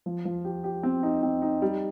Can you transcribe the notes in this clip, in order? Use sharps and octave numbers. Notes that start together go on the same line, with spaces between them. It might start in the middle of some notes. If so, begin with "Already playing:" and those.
F3
F3
G4
G4
C4
D#4
C4
D#4
G3